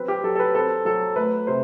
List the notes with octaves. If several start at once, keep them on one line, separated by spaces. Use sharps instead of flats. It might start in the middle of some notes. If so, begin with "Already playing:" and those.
Already playing: F#3 C4 B4
G4
F#3 A4
A4
B4
C4 A4
F#3 A4
A3 B4
C3 C5